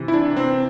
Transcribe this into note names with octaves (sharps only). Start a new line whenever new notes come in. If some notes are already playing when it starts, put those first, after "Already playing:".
Already playing: C3 E3
E4
D4
C4